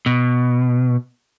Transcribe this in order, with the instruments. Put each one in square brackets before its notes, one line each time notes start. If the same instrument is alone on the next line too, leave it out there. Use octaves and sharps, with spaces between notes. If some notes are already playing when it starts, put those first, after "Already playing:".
[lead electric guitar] B2